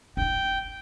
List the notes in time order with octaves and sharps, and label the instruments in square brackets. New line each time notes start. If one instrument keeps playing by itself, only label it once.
[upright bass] D4 E4 [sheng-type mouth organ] G5